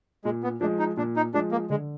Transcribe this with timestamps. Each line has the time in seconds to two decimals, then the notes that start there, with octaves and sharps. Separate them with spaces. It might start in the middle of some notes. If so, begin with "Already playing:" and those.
0.24 A#2 G#3
0.43 B3
0.61 F3 G#3 D4
0.79 D#4
0.97 A#2 D4
1.16 D#4
1.34 F3 G#3 D4
1.51 A#3
1.70 D3 G#3